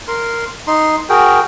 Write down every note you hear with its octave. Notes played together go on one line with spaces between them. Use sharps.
A#4 C6
D#4 C6
F#4 G#4 A#4 G5